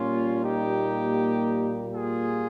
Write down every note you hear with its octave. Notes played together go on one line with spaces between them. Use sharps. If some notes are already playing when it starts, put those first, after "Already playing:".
Already playing: A#2 G3 A#3 C#4 F4
D#4 G4
F4 G#4